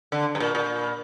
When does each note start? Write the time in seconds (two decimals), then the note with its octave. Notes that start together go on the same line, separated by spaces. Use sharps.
0.12 D3
0.35 G2
0.40 A#2
0.55 A#2